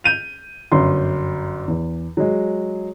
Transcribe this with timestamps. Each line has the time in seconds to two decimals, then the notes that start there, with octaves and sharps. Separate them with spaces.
0.04 G6 D#7 F7
0.72 G1 F#2 C6
1.68 E2
2.17 F#3 G#3